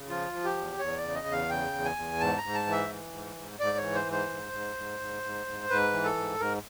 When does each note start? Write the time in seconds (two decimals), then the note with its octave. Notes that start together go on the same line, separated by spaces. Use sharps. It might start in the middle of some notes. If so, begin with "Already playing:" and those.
Already playing: C#3
0.09 F3 F4
0.33 F3
0.44 G4
0.57 E2
0.79 E2 C#5
0.97 D5
1.03 C#3
1.15 D#5
1.27 E2
1.32 F5
1.49 C#3 G5
1.73 E2
1.85 G#5
1.96 E2
2.20 G#2 A5
2.38 A#5
2.43 G#2
2.54 A5
2.67 E3
2.72 E5
2.90 E3
3.13 G#2
3.36 G#2
3.60 G#2 D5
3.77 C#5
3.82 E3
3.95 C5
4.06 G#2
4.12 C5
4.30 G#2
4.53 G#2
4.76 G#2
5.00 G#2
5.23 G#2
5.46 G#2
5.70 G#2 B4
5.93 E3
6.04 A4
6.16 G#2
6.40 G#2 A#4